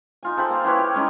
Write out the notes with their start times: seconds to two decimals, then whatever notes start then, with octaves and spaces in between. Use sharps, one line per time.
0.23 D#4 F4 G#5
0.37 A4 C5 G5 B5
0.50 A#3 F5
0.65 E4 G4 B4 C#5
0.79 G4
0.94 G#3 C#4 D#4 E4